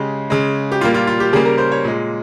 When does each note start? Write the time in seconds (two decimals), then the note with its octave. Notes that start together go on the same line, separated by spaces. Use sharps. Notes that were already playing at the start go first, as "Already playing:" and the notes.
Already playing: C#3 G#3 G4
0.30 C#3 G#3
0.72 G4
0.81 A#2 G3 A#3 F4
0.94 F4
1.07 F4
1.20 G4
1.33 C#3 G3 A#3 G#4
1.45 A#4
1.58 C5
1.71 C#5
1.84 A#2 G#3